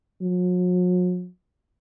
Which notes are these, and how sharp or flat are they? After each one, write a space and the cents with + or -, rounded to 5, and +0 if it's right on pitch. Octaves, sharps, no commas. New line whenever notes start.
F#3 -45